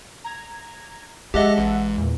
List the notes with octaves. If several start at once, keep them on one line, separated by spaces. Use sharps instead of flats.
A#5 G#6
G#3 G4 D#5 E5 F#5 A5
A1
E2 A#2